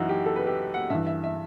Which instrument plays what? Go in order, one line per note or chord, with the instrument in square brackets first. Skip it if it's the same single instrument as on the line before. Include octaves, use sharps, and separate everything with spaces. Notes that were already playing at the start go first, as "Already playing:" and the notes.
Already playing: [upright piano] F#2 E3 D#4 E4 F#4
G4
A4
B4
G4
F#5
G2 E3 E5
E5
E5